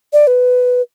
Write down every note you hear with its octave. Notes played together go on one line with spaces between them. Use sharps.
D5
B4